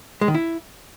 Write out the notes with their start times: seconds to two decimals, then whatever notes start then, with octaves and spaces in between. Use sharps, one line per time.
0.21 G#3
0.28 D#3
0.34 E4